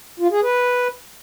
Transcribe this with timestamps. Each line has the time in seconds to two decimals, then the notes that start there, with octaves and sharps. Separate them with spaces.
0.20 F4
0.31 G#4
0.43 B4